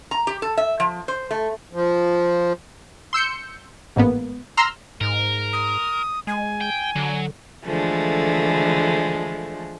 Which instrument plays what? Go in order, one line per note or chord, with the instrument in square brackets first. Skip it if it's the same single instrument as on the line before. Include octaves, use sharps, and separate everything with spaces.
[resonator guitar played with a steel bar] A#5
G4
A4
E5
F3
C5
A3
[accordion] F3
[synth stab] C6 E6 G6 C#7
A1 G#2 A#3 B3
A#5 C6 E6 F6
[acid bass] G#2 [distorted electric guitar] A#4
[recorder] D#6
[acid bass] G#3 [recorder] G#5
[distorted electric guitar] G5
[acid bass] D3 [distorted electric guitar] F#3
[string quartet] D3 E3 F3 G#3 A3